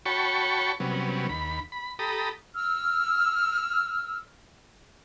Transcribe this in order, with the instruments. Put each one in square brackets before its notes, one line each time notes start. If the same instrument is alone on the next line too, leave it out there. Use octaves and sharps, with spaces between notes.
[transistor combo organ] F#4 C#5 G5 A5 B5 C#6
C3 F#3 G3 B3 C#4
D#2 B5
B5
G4 A4 A#5 B5 D#6
[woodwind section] E6 F6